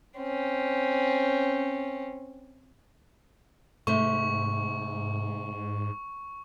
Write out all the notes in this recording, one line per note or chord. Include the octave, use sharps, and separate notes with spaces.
C4 C#4
G#2 C3 A3 C#6